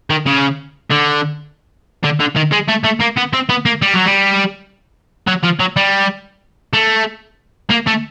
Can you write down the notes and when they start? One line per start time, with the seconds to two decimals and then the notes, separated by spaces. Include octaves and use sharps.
0.10 D#3
0.26 C#3
0.90 D3
2.04 D3
2.20 D3
2.36 D#3
2.52 G#3
2.69 A3
2.85 A3
3.01 A#3
3.17 B3
3.33 C4
3.49 B3
3.66 A#3
3.82 G3
3.94 F#3
4.06 G3
5.28 F#3
5.44 F3
5.60 F#3
5.77 G3
6.74 A3
7.70 A#3
7.87 A3